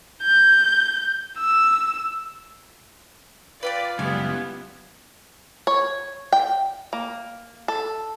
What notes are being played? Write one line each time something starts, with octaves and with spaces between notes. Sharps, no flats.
G6
E6
F4 B4 D5 G5 B5
C#2 F#2 G3 B3 E4 G#5
C#5
G5
A#3
A4